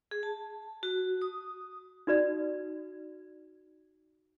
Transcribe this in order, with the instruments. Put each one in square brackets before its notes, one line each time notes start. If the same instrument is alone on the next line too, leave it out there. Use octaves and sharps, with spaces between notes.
[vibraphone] G#4
A5
F#4
D#6
[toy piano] D#4 F#4 B4 D5